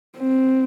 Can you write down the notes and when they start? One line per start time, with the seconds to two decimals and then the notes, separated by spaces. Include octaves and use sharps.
0.19 C4